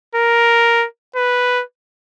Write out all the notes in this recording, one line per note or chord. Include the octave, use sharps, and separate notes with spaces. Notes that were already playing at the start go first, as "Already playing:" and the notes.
A#4
B4